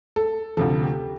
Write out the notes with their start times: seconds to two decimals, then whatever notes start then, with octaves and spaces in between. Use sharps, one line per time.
0.16 A4
0.57 D2 C3 F3 A4
0.84 G4